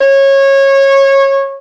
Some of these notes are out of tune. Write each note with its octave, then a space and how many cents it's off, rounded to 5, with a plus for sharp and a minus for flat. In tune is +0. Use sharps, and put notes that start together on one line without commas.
C#5 -20